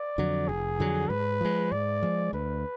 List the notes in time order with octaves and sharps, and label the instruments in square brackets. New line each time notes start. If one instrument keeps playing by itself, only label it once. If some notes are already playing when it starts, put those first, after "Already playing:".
Already playing: [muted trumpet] D5
[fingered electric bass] F2 D3 F#3
[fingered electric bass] F1 [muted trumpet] G#4
[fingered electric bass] F2 D3 F#3
[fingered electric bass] G#2 [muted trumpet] B4
[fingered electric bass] F3 G#3
[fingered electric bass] G#2 [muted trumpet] D5
[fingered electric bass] F3 G#3
[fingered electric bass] D2 [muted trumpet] B4